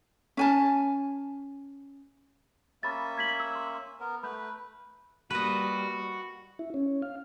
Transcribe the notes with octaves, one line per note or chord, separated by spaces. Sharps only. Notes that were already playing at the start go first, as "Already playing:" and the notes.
C#4 G#5 A5
A#3 C#4 E5 B5 A6
G#6 B6 F#7
E6
C6
B3 A#4
A3 B4 B5 G6
G3 A#3 F#4 B4 D#5
E4
C#4
F5